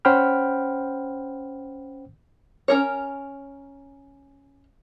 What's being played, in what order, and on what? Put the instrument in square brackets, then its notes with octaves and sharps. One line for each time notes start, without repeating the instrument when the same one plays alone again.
[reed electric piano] C#4 C5 F#5 G5 B5 F6
[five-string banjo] C#4 A#4 C#5